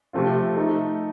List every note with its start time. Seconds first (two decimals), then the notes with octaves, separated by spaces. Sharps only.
0.13 C3 F3 A3 C4 F4
0.56 A3 D#4 A4